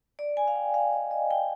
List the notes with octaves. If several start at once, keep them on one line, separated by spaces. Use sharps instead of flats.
D5
G#5
F5
G5
F5
D#5
D#5
G5